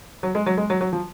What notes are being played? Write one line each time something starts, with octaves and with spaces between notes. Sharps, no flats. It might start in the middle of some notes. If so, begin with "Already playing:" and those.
F#3
G#3
F#3
G#3
F#3
F#3
F3